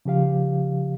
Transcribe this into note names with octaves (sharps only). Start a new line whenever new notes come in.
C#3 F3 G4 F5